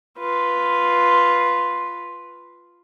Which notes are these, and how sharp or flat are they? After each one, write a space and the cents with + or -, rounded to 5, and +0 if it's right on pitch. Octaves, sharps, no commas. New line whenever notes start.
F4 +0 B4 +0